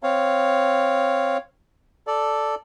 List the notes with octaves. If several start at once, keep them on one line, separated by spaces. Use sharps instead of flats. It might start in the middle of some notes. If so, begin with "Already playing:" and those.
C4 C#5 F5
A4 D5